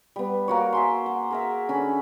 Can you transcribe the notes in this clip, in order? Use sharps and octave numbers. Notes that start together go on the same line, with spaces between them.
G3 B3
A#3 F#4 C#5
E5 G#5 C6
F#5
G#4 A#4 E5
D3 C#4 B5